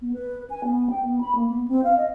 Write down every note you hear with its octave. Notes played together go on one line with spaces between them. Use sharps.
B3
B4
G#5
B3
G5
B3
B5
A#3
B3
C4
F5
D#5